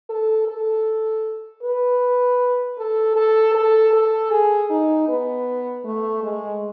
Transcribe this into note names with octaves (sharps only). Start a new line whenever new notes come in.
A4
A4
B4
A4
A4
A4
A4
G#4
D#4
B3
A3
G#3